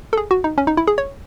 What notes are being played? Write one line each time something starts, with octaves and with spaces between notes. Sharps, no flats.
A4
G#4
F#4
D#4
C#4
D#4
E4
G#4
C#5